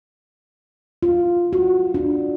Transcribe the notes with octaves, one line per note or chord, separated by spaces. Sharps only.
F4
F#4
D4